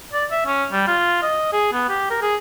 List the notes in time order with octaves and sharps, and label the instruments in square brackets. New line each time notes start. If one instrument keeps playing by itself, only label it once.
[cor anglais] D5
E5
C#4
G3
F4
D#5
G#4
B3
G4
A#4
G#4